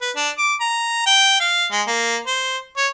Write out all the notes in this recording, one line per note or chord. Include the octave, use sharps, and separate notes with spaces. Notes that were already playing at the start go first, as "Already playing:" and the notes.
B4
D4
D6
A#5
G5
F5
G#3
A#3
C5
C#5